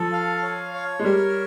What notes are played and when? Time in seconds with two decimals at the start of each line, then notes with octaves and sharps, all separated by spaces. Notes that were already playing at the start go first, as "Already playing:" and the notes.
Already playing: F3 A4
0.12 F5
0.42 C#5
0.74 C#5
0.99 G#3
1.04 G3 A#4